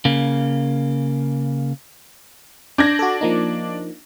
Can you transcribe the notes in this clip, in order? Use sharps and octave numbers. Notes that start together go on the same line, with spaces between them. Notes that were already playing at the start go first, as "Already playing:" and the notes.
C#3 A#3
D4 G6 G#6 A#6
F#4 A4
F3 A#3 D#4